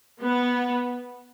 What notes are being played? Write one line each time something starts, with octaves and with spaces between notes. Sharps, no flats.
B3